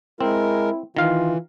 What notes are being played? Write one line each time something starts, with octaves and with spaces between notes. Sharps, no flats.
G#3 C4 E4 A#4
D#3 E3 F4 F5